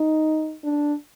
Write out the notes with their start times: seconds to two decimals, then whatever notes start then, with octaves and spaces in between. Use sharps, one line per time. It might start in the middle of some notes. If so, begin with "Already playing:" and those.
Already playing: D#4
0.64 D4